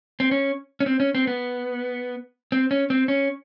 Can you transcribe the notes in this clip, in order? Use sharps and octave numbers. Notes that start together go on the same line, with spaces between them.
C4
C#4
C#4
C4
C#4
C4
B3
C4
C#4
C4
C#4